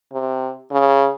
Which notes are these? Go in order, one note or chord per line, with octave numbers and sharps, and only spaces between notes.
C3
C#3